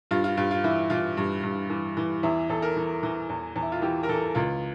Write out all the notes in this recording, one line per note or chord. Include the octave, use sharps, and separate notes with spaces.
G2 F4
F4
G2 F4
F4
E3 E4
E3 F4
G2
G2
E3
E3
E2 E4
E2 A4
A#4
E3
E3
E2
E2
E4
F4
E3 G4
A#4
E3 A4
C#2 F4